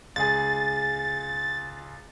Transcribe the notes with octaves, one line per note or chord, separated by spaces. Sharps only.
C#2 G#4 A6